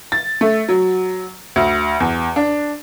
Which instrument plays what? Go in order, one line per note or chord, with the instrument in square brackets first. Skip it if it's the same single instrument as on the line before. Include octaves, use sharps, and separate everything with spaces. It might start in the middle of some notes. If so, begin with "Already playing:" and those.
[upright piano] A6
A3
F#3
D2
E2
D4